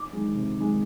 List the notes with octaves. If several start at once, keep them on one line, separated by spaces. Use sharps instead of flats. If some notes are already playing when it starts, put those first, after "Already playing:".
Already playing: D6
D#3 G#3
C3
D#3 G#3